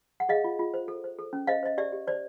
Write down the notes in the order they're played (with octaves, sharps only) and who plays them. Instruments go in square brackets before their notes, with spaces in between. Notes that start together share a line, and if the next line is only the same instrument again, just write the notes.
[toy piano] F#5
G#4 D#5 F5
F4
F4
C5
A4
C5
A4
C#4
C5 D#5 F5
C5 D#5
G4 D5 E5
G4
C5 D5